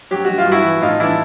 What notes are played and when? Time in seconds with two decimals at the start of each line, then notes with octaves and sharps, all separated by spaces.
0.11 F#3 G4
0.25 F#3 F#4
0.38 F4
0.46 G2
0.52 E4 F#4
0.64 E3
0.82 A2 D#4 F4
1.00 E3 D4 E4